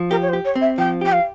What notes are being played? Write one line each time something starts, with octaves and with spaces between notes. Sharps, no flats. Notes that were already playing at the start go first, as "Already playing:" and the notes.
Already playing: F3
G4 A#4
C#5
C5
G4
C#5
C4
E5
F3 G5
G4 G5
F5